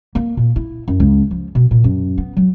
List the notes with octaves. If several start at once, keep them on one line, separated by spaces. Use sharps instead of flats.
A#3
A#2
E4
F#2
C#2
F3
B2
A#2
F#2
B3
F#3